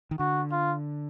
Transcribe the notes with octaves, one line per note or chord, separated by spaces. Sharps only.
D#3
D3 F#4
F4